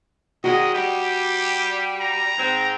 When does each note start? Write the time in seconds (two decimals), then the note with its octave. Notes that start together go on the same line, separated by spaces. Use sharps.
0.44 D#3 G3 G#3 F#4 D#5
0.74 G3 G4
2.00 A#5
2.37 G#2 C4